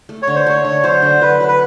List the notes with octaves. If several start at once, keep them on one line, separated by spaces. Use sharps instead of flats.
A3
D3 C#5
C5
A3 C#5
D3
F#3 C5
D3
F#3 B4
F#3
B4